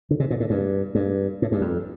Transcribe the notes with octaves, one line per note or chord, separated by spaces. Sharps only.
D3
C3
A#2
A2
G2
G2
A2
G2
F2